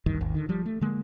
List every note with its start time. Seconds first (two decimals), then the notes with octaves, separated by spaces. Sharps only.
0.06 G#1 D2 G2 D#3
0.21 G#1 D#2
0.35 D3 D#3
0.49 F3 G3
0.66 A3
0.81 D3 G#3 A#3